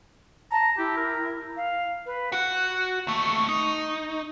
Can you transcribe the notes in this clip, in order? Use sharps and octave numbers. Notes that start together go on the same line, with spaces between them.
A5 A#5
E4 G4
A#4
F5
B4
F#4 F#5 F#6
D#2 A3 C#6
D#4